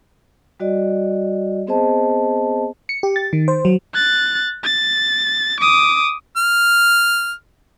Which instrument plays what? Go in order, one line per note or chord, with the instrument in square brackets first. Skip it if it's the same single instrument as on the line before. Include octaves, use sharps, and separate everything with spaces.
[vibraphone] G3 F#4 D5 D#5
B3 C4 G#4 C5 D#5 A5
[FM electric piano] C#7
G4
A6
D#3
C5
F#3
[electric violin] F#6 A6
A6
D6 D#6
[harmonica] F6